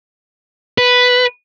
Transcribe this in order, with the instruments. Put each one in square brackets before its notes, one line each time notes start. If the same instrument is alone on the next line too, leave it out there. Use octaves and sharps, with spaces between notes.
[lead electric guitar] B4